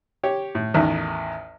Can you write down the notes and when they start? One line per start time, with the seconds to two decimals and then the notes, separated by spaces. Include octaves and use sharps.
0.23 G4 C#5
0.55 A2
0.74 A1 E2 D#3